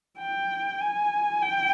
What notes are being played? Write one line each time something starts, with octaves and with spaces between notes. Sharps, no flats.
G5
G#5
G5